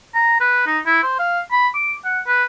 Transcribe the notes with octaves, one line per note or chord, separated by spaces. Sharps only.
A#5
B4
D#4
E4
C5
F5
B5
D6
F#5
B4